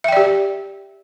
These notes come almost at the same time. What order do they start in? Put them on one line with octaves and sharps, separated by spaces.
E5 G5 D5 G4